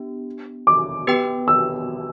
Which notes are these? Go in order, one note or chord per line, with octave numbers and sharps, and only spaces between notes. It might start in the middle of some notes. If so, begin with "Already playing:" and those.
Already playing: B3 D4 G4
D6
B3 G4 B4 G5
E6